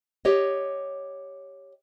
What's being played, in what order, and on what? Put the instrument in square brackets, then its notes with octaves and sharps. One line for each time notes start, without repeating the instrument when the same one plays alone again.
[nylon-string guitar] G4 C#5 D#5